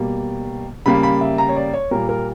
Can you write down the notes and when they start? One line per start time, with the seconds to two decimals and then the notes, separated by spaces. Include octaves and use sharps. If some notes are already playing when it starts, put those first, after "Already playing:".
Already playing: B2 G3 A#3
0.86 C#3 G3 A#3 B5
1.03 B5
1.21 E5
1.38 A#5
1.49 C#5
1.56 D5
1.74 C#5
1.91 A#2 G3 A#3 A#4
2.09 A#4